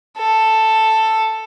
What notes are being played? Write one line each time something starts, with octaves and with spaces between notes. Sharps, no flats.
A4